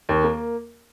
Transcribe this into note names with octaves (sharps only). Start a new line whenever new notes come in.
D#2
A#3